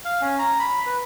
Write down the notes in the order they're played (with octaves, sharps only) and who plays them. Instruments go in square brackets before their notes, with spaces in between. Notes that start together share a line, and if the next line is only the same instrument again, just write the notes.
[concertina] F5
C#4
A#5
B5
B4